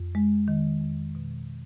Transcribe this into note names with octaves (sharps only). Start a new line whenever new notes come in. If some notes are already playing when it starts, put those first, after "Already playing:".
Already playing: F2
G#3
D#3
F2
B2